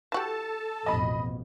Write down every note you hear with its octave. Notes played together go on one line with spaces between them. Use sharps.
E3 F#4 G4 A4 A5
A1 F2 B2 D#5 B5